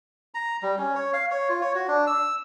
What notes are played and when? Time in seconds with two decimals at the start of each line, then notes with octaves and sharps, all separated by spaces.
0.34 A#5
0.62 G3
0.78 C#4
0.95 C#5
1.13 F5
1.31 C#5
1.49 F4
1.61 C#5
1.75 F#4
1.88 D4
2.07 E6